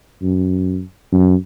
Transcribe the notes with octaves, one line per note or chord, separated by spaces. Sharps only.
F#2
F#2